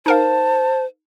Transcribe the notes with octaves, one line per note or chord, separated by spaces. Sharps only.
D#4 A#4 C5 F5 A5